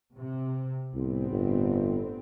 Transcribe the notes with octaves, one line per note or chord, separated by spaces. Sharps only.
C3
C2 A2 B3 C4
G1